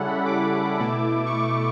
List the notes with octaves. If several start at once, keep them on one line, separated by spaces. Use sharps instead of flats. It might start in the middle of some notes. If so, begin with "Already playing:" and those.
Already playing: C#3 G3 C#4 E4 A4 F#5
B5
D6
B2 A3 E4
C#6
D6